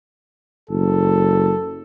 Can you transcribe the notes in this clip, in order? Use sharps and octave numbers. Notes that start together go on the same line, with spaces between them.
F#1 A4